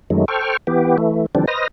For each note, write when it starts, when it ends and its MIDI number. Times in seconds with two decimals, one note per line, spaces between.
0.10 0.25 42
0.10 0.25 51
0.10 0.25 54
0.10 0.25 56
0.10 0.25 57
0.28 0.57 69
0.28 0.57 72
0.28 0.57 79
0.28 0.57 85
0.28 0.57 89
0.67 0.97 52
0.67 0.97 59
0.67 0.97 67
0.98 1.26 52
0.98 1.26 57
1.35 1.45 50
1.35 1.45 52
1.35 1.45 53
1.35 1.45 55
1.35 1.45 60
1.35 1.45 62
1.48 1.68 71
1.48 1.68 72
1.48 1.68 75
1.48 1.68 87
1.48 1.68 89
1.48 1.68 94